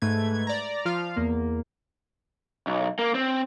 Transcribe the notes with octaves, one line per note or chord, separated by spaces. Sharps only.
G#2 A3 B4 G#6
D5 A#5
F3 F4 F5
E2 A#3
B1
A#3
C4